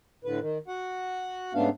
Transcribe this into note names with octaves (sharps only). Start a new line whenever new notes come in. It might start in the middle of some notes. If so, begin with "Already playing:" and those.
A2 D3 B4
D#3
F#4 F#5
G#2 C#3 A3 B3 D4 F5